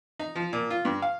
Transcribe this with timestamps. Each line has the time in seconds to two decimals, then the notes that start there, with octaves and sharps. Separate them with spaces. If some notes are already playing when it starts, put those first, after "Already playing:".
0.20 D#4
0.36 F3
0.53 A#2
0.70 F4
0.85 G2
1.02 F5